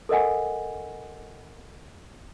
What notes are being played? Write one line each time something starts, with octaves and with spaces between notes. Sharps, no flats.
A4 A#4 D#5 F#5 G#5